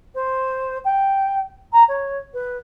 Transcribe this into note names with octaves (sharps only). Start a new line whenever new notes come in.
C5
G5
A#5
C#5
B4